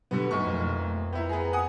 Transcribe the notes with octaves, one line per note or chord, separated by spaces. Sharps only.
B2 D3 F#3 G3 B3
B1 A3 B4 C#6
F2 A#3
B3 E4 G5 A#5
B3 G#4
F#5 G#5 D#6